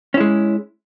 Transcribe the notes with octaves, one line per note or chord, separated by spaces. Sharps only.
G#3 C#4 E4